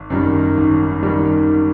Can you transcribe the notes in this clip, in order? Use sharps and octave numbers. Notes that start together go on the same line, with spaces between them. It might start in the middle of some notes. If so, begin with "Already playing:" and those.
Already playing: G#1
F#2 D#3 G3
G#1
F#2 D#3 G3